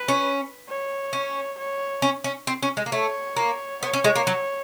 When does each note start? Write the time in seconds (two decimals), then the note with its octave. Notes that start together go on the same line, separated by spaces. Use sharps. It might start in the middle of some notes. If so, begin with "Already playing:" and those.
Already playing: B4
0.08 C#4
0.68 C#5
1.13 C#4
1.58 C#5
2.02 C#4
2.24 C#4
2.47 C4
2.63 C#4
2.77 G#3
2.86 A#3
2.92 A3 C#5
3.36 A#3
3.83 B3 C#5
3.93 C#4
4.04 G#3
4.16 A#3
4.27 F#3